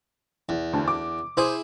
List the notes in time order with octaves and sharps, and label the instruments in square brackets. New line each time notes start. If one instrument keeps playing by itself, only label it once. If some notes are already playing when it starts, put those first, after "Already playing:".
[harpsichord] E2
[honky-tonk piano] D2 A5
D6
[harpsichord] E4 G#4 [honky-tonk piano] C5